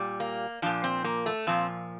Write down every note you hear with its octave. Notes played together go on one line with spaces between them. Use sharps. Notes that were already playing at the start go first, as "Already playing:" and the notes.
Already playing: A#2 G3
A#3
A#2 F3 D4
C4
A#3
A3
A#2 F3 C4